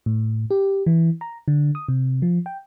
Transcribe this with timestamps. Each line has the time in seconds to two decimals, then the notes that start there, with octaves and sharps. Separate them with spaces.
0.06 A2
0.51 G4
0.86 E3
1.21 A#5
1.48 D3
1.75 D#6
1.88 C3
2.22 F3
2.46 G5